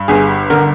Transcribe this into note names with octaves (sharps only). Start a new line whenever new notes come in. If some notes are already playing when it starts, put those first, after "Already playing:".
Already playing: G2
G1 G#4
D3 A#4